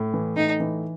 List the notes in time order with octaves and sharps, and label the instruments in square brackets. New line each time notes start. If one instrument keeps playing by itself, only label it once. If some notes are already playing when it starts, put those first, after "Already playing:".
Already playing: [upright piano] A2
E3
[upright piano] A2 [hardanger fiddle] D#4
[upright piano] E3